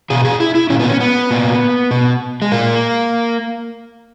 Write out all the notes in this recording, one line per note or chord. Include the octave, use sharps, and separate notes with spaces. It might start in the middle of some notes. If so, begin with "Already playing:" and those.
B2 G#4
G#4
E4
E4
A#2 C#4
B3
C#4
B3
A#2
B2
G#3
A#2 A#3